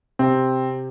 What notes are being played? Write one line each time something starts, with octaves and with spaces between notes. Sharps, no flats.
C3 C4